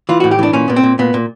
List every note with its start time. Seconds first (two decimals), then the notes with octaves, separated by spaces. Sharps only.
0.09 E3 F4
0.20 F#4
0.24 A2
0.31 G4
0.39 E3 D4
0.53 A#2 C#4
0.68 A#2 B3
0.76 C4
0.83 A#2
0.99 A#2 B3
1.14 A#2